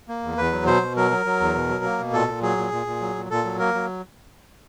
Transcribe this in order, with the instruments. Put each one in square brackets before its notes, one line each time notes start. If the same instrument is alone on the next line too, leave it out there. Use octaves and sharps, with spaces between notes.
[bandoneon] A#3
E2
E2 B4
F#3
B2 C5
B2
F#3 A#4
F#3
F#3
E2
B2
F#3
A#3
B2
A#2 A4
A#2
F#3 G#4
A#2
A#2
A#2
F#3
A#2
A#2 A4
F#3
A#3 A#4
F#3